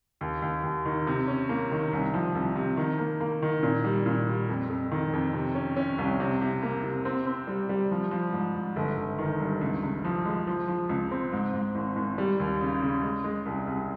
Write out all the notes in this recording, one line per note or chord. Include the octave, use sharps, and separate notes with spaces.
D#2
D#2
D#2
D#3
C3
C#4
A#3
D#3
C2
F3
C2
C3
D#3
A#3
A#3
D#3
A#2
G3
A#2
G3
F2
F2
D#3
F2
C3
C#4
C#4
C2
C3
C3
A#3
C3
C4
C4
G3
G3
F3
F3
G#2
G#2
G1
G1
D#3
G2
C#2
C#2
F3
G#3
F3
F3
C#2
C4
G#2
G#2
G#1
G#1
G3
D#2
C#3
C#3
G#3
G#3
C2
C2